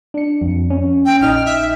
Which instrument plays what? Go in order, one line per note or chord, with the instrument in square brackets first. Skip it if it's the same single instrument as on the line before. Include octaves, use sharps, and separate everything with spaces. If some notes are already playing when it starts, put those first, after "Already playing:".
[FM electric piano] D4 C#7
F2
C#4
[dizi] G5
[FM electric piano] A#1 D#4 D#5 [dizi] F6
[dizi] E5